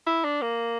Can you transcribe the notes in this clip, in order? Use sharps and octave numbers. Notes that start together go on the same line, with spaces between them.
E4
D4
A#3